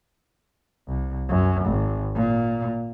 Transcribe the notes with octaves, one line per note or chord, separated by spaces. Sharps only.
C2
F#2
G#1
A#2